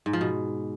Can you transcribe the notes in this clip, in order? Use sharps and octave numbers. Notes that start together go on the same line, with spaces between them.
G#2
F3
B2